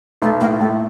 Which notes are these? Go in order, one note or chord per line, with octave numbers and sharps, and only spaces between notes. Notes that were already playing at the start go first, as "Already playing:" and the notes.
B1 A3
A2 A#3
A2 A3